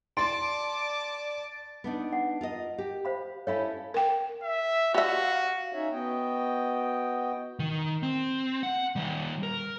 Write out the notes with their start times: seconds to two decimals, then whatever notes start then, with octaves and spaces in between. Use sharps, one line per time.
0.17 D5 A5 C6 D6 A6 D7
1.84 B3 D4 D#4
2.13 F#5
2.41 F4 A#4 D#5
2.78 G4
3.05 C5 F5 B5
3.47 C#4 E4 A4 C#5 F5 B5
3.94 A#4 G5
4.43 E5
4.94 F#4 G4 E5 F5
5.73 C#4 D#4 C#5 E5
5.91 B3 F#4 D#5 G5
7.59 D#3
8.03 C4
8.63 F#5
8.96 D#3 G3
9.43 A#4